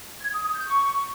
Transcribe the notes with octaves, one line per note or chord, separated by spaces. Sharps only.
G#6
D#6
D#6
G6
C#6